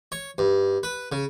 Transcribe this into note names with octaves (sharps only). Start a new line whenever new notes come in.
C#5
G2
B4
C#3